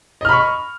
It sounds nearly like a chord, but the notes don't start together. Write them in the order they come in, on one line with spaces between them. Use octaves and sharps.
D#5 F6 B5 C#6